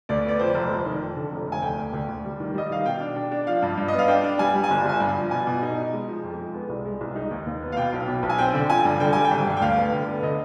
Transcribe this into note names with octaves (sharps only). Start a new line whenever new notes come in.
D2 D5
B3 D5
F2 C5
F1
F1
D#3
F2
D3
F1
F1 G#5
D2 G5
D2
D2
D2
G3
D#3
G3 D#5
D#3 F5
B2 G5
D4
D4
D4
F3 F5
G2
G2
B3 D#5
F5
D4 G5
D4
G3 G#5
G3
G#5
G1
G1 G#5
G2
F3
B2 G#5
B2
D#4
D#4
G#3
F3
F2
G#3
B3
C2
G#3
C2
D#4
D#2
D#2
B3
F5
B2 G5
B1
B2
B1
G#5
C4 G5
D3
F3 G#5
G2
D3 G5
G3 G#5
G5
G#1
G2
G5
D2 F5
B3
D3
B3
D3 D#5